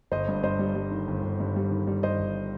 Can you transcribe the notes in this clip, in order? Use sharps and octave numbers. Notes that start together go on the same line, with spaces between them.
G1 C5 D#5
G2
G2 C5 D#5
G3
G3
D#3
G1
G1
G2
G3
D#3
G3
G2 C5 D#5
G1